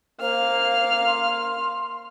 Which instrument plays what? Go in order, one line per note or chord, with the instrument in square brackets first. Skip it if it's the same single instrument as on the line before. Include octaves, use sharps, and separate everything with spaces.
[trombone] A#3 [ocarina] C5 [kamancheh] F5 F6
[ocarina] C6